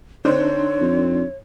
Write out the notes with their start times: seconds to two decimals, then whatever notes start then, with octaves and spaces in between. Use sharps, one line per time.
0.25 D3 C4 D4 D#4 C5 C#5
0.81 F2